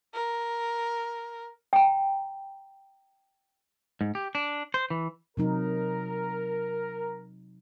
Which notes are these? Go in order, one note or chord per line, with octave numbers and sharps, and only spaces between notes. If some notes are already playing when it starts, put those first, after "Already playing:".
A#4
G5 A#5
G#2
G4
D4
C5
E3
C3 F#3 D#4 A#4